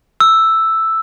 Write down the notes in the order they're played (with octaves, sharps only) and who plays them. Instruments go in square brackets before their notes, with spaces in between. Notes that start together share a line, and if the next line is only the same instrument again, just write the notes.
[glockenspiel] E6